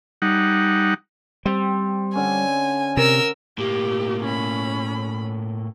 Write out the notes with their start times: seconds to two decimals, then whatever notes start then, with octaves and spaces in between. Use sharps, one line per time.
0.22 G3 D#4 F#5
1.46 G3 C4
2.15 D3 C#4 G#5
2.97 C3 A#4 E6
3.58 A2 A#3 G4
4.24 C#4 B5